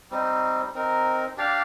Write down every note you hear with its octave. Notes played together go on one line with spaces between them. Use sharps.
G3 C4 D#4
C4 D#4 A#4
D4 G4 D5 F5